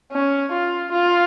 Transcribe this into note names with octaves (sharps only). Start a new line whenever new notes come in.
C#4
F4
F4